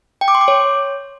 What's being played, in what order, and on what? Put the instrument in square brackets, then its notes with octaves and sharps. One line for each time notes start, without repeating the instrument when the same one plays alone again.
[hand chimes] G5
D6
C6
D6
C#5